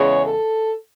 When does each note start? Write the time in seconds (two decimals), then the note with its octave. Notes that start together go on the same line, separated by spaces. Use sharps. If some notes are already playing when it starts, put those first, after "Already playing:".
Already playing: E2 C#3 G#3 C#5
0.24 A4